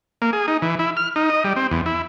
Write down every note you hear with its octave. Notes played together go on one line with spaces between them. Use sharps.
A#3
G#4
D#4
E3
E4
F6
D#4
D#5
G3
C4
E2
E4